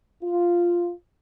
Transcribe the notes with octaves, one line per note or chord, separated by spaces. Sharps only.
F4